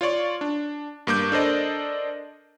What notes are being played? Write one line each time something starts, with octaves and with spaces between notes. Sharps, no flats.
F4 C#5 D5 C#6
D4
G2 A#3 D6 G6
D4 A4 A#4 C5 D5 D#5